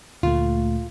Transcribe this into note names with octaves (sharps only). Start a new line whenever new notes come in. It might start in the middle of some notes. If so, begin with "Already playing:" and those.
D2 A#2 A3 F4